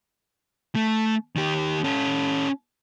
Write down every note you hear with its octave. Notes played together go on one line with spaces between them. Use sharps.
A3
D#3 G4
C#4 A4